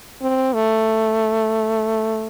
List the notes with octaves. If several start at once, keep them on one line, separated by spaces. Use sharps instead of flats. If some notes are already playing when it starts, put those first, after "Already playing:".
C4
A3